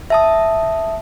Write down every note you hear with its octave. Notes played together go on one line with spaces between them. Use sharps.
E5 A5 D#6